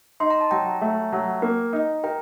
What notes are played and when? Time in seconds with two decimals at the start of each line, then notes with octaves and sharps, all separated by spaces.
0.20 D#4 C6
0.30 A#5
0.41 A5
0.51 F#3 G5 A#5
0.81 A3
1.12 F#3
1.42 A#3
1.73 D#4
2.04 A#4 G5 A#5